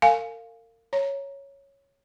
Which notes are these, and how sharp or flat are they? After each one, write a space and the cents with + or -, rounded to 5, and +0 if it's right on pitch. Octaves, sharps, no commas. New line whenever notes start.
A#4 -40 F5 +0 G#5 +0
C#5 +0 A#5 +0